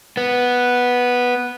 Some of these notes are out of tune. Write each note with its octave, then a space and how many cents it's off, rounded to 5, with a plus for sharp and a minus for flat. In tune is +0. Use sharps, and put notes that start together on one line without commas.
B3 -5